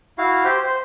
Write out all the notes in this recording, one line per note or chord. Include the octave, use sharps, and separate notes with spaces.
E4 F#4 F5
G4 C5
C5